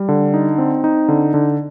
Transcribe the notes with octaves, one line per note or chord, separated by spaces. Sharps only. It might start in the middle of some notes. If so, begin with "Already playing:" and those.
Already playing: G3
D3
D#4
C4
D#4
D3
D3